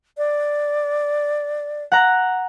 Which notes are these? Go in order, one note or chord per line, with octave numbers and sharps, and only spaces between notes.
D5
F#5 A#5